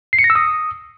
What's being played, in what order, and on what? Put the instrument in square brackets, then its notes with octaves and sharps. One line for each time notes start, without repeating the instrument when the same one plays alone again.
[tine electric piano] C7
C#7
A#6
E6
D#6